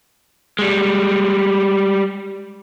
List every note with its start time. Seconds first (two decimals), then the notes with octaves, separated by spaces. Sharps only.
0.59 G3 G#3